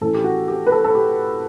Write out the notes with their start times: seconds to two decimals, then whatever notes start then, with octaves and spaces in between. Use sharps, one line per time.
0.01 A2 E3 A3 C#4 A4
0.14 G4
0.24 F#4
0.48 G4
0.67 B4
0.72 A4
0.84 A4
0.95 G4